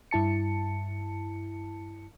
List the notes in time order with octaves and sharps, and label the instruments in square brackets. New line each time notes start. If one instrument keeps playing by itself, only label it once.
[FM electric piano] G2 E4 A5 C#7